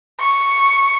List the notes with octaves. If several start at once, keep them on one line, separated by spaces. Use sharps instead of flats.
C#6